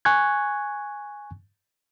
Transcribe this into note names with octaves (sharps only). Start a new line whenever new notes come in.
G#5 C#6 F#6 G#6